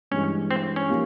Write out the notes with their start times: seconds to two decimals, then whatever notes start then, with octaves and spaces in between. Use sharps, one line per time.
0.11 G2 E3 G#3 C#4
0.51 C4
0.76 C#4
0.89 F3 A#3 D#4 G4